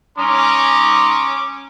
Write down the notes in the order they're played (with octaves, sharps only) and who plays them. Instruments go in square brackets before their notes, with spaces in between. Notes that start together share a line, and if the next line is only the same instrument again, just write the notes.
[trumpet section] C#4 D6 [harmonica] A#5 C6 D#6